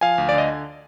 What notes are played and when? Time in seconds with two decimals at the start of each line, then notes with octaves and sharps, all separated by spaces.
0.01 F3 F5 G#5
0.18 D2
0.29 D5
0.33 D3 D#5